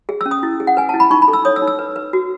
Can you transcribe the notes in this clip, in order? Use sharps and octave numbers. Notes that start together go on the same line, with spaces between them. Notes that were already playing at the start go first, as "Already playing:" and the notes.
G#4
E6
C#4
D#6
E4
G#4
F#5
B4 G#5
E4 A5
B5
D#4 C#6
B5
A4
E6
C#5 D#6
E6
D#4
E6
B4
B4
F#4